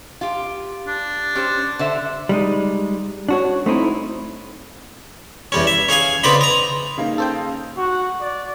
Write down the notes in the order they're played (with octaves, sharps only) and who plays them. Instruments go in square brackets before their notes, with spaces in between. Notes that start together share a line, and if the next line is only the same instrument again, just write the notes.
[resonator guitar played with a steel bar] F4 G4
[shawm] D4
[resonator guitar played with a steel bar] C#4 G4 C5
D3 C5 E5
[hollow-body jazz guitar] G3 G#3 D#4
D4 F#4 C#5
A3 C4 D#4 E4
[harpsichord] E2 G3 C#4
E5
C#4 G#4 F5 G#5
C#3 B3 C4 D4 D#5 B5
D#5 A#5
[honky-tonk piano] C#3 A#3 D#4
[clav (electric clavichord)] A4 C5 G5
[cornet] F#4
D5